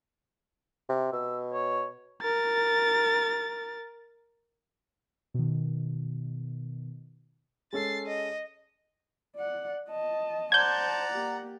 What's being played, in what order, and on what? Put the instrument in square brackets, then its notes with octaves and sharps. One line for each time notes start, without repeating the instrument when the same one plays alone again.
[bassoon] C3
[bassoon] B2 [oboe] E6
[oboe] C#5
[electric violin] A#4 A6
[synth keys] B2 D#3
[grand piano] G#3 C#4 A4 [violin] A6 C7
[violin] D#5
[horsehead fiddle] D5 F#5
D#5 A5
[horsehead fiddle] C5 A5 [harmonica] D5 F#5 A#5 [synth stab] G6 G#6
[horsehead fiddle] A#3 G4